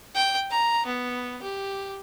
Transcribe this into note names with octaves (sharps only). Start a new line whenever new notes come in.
G5
A#5
B3
G4